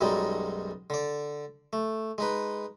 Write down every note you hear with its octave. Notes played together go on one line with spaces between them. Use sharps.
B1 F#2 G3 G#3 D#4
D3 D5
A3
G#3 D#4 B4